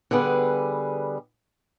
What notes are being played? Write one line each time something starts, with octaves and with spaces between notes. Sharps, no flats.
D3 G3 B3 G#4 B4